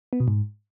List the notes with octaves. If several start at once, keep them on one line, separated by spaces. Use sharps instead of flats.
B3
B2
G#2